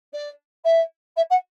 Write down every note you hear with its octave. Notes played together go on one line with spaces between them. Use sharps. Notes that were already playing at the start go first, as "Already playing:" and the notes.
D5
E5
E5
F#5